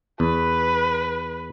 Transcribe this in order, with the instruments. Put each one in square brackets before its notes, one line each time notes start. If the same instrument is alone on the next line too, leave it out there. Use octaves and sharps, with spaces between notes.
[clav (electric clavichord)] E2 [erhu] B4